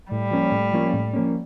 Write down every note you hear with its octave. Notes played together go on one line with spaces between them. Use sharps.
A2 G3
F3 A#3 C#4
A2
F3 A#3 C#4
A2
F3 A#3 C#4